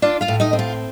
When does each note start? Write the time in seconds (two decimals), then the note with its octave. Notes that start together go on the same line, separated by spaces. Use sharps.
0.02 D4 F4 D5
0.21 F4 F5
0.28 A2
0.40 D#4 D#5
0.53 C4
0.59 F4